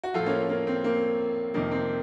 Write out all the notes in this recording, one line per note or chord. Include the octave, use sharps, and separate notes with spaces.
F#4
A2 F3 F4 A4
A#3 C#4
A#3
C4
A#3
F2 C3 D#3 A#3
C4